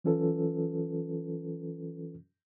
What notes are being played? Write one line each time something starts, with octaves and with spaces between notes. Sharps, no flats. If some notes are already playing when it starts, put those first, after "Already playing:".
E3 F#3 C#4 F4 A4 B4